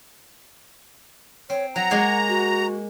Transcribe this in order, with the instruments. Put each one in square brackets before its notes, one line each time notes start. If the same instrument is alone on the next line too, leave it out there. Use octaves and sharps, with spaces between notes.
[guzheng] C4 [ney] C#5
[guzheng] F#3 [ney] F#5 [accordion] A#5
[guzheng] G#3 A#3 C#5
[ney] F#4